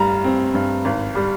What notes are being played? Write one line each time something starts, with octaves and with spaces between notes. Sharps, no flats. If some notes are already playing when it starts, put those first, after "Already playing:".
Already playing: G1 G2 G3 A#5
C4
G2
G#1
G3